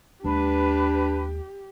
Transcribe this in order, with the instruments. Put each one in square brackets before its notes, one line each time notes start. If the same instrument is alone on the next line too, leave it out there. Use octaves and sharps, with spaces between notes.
[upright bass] D#2 G#3 [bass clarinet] D4 [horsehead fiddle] G4 [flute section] B4